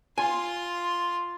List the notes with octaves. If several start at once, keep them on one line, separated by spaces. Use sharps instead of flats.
F4 G#5 C6